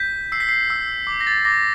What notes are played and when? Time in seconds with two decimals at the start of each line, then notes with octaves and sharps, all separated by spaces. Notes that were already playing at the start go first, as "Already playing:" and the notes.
Already playing: G6 B6
0.32 E6 C7
0.40 B6
0.49 C7
0.70 E6
1.07 D6
1.21 A#6
1.27 A6
1.45 D6 A#6